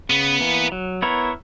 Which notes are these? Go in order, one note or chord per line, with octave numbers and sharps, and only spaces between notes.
C#3 B3
E3 A#3
F#3
B3 E4 A#4 C#5